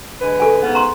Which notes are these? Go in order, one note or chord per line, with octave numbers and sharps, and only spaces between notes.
D3 G#3 B4
A4 G#5
G#2 C#3 B3
A#5 C6